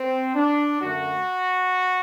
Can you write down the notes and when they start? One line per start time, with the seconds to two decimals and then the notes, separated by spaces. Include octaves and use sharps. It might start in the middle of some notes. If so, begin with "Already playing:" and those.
Already playing: C4
0.35 D4
0.81 F#2 D3 A3 F#4